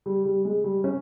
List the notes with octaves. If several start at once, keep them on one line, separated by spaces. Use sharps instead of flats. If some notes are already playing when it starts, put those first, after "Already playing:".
G3
G3
G#3
G3
C#4